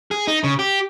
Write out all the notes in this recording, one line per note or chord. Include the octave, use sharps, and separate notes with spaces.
G#4
D#4
C#3
G4